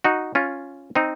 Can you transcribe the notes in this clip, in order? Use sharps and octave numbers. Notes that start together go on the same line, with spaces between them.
D#4 F#4
C#4 F4
C4 D#4